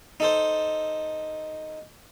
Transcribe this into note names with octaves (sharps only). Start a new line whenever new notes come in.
D#4 A4 C5